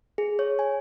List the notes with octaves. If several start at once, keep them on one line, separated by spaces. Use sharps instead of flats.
G#4
C#5
G#5